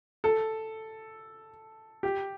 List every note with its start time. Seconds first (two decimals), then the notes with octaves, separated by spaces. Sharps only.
0.24 A4
2.03 G4